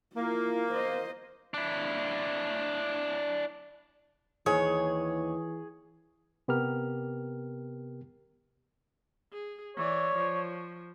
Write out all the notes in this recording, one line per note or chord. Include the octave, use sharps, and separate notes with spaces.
A#3 E4 F4
C5 D#5
D4 E4
D#2 E3 G#4 C#5
C3 B3 G4 A#4 F6
G#4
E3 C#5 D5
F3